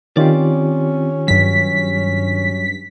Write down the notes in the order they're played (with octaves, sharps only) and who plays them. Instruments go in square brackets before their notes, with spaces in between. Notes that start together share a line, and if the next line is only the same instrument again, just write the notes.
[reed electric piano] D#3 F4 G4 [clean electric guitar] C4 D5 [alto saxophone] C#4
[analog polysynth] G2 B6 [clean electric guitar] F#3